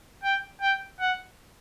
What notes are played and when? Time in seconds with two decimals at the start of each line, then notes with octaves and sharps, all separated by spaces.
0.23 G5
0.61 G5
1.00 F#5